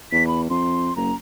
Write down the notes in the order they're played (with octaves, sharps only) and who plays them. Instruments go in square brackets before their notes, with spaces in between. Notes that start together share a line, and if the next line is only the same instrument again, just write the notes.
[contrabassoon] E2 [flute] B6
[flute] B5
[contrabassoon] F2 [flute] C6
[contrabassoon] F#1 [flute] A#5